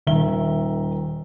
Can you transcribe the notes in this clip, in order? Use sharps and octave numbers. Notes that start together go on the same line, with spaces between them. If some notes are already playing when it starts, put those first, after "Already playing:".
D#1 D#3 E5 G7